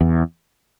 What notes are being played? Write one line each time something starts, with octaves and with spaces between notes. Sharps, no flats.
E2